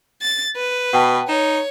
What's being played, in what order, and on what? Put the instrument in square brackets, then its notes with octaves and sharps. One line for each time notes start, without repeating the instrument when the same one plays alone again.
[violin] A6
B4
[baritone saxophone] B2 [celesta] F#5 G5 A5
[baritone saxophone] D#4 [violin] C#5 [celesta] E7